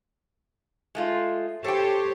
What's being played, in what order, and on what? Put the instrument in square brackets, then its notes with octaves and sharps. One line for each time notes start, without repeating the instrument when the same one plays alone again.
[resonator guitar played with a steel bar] G#3 A3 F4
[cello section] G4 C5 C#5 [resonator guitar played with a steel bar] A4 G5